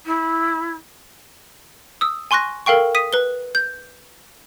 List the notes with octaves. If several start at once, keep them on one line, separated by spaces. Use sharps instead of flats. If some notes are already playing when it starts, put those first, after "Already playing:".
E4
D#6 E6
G#5 C6 C#6 F#6 A#6
A4 A#4 F5 G5 C#6
D#6 B6 D#7
B4 G7
G6